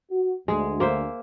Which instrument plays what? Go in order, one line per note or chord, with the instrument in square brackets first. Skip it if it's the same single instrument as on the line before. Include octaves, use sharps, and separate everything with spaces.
[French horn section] F#4
[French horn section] D2 [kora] G#3 G#4
[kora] A#3 C5 E5